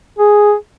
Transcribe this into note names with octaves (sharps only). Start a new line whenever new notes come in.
G#4